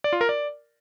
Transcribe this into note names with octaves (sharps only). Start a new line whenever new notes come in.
D5
F4
A#4
D5